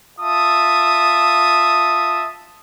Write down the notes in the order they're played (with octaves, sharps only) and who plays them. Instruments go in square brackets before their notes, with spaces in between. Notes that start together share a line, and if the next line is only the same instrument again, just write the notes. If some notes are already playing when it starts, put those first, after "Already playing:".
[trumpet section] F4 E5 A5 D#6